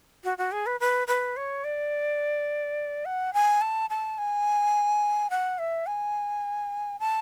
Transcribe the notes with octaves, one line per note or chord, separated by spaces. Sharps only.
F#4
F#4
G#4
B4
B4
B4
C#5
D5
F#5
G#5
A5
A5
G#5
F#5
E5
G#5
A5